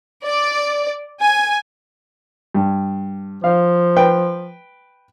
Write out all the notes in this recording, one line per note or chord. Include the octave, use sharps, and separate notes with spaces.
D5
G#5
G2
F3 F5
B4 G5